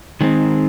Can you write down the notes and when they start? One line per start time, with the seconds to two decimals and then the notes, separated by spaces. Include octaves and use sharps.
0.21 D#3 G#3 C4